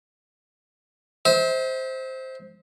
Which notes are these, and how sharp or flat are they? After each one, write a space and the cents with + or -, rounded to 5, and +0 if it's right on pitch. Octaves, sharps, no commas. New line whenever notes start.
C5 +0 E5 -40